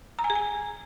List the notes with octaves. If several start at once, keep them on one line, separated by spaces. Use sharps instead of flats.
A#5
G#5
G#4
G#5